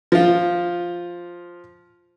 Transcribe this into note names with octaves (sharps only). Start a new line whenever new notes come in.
F3 F4